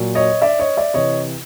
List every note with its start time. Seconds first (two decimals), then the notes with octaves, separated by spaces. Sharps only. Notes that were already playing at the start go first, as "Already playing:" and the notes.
Already playing: A#2 F#3
0.15 C#5 D#5
0.41 D5 E5
0.59 C#5 D#5
0.77 D5 E5
0.94 C3 E3 C#5 D#5